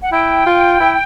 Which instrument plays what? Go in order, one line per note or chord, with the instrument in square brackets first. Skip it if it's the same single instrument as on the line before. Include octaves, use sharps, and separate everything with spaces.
[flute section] F#5
[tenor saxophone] E4 [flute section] G5
[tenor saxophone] F4
E4